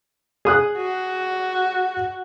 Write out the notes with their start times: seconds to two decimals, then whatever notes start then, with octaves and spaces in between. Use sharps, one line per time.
0.45 G#4 D#6 F#6
0.77 F#4